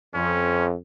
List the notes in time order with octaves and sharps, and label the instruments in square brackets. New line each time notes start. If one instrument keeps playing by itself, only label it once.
[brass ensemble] F2 [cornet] C#4